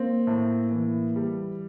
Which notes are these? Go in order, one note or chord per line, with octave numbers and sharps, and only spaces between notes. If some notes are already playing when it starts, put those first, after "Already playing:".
Already playing: A#3 C4
A2
E3
G3